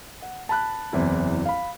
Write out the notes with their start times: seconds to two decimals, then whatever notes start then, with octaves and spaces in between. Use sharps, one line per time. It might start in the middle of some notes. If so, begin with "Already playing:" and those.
0.22 F#5
0.49 A5 B5 F#6
0.93 F#1 E2 E3 C4 E4
1.45 F5 B5